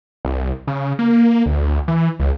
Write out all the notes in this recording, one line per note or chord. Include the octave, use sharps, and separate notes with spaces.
C2
C#3
A#3
D2
E3
C#2